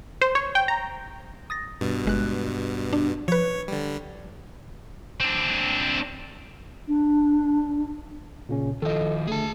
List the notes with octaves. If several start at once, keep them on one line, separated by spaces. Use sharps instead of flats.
C5
C#5
G5
A#5
D#6 A6 A#6
G2 B2
G1 G#3 F#6
D4
F3 B4 C#5
D3 G3
C4 D4
D4
A#2 C#3 C#4
D#3 F3 A4 D#5
D3 A3 G#4 A5